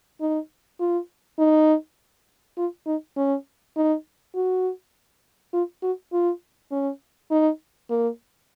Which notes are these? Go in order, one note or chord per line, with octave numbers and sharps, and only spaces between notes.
D#4
F4
D#4
F4
D#4
C#4
D#4
F#4
F4
F#4
F4
C#4
D#4
A#3